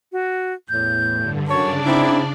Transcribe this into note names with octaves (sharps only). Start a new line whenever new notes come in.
F#4
E2 A2 G6
G2 D3
F#2 C#3 D4 C#5 D5 A5
C4 D#4 E4